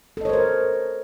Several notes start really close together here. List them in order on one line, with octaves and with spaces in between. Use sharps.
A4 D#5 C#5 C5 A#4